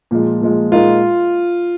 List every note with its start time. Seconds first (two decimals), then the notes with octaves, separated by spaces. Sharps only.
0.11 A#2 F3 G#3
0.41 A#2 F3 G#3
0.71 A#2 G#3 D#4 F4 A#4